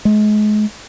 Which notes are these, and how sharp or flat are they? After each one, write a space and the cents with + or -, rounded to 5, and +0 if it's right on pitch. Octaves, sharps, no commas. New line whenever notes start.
G#3 +35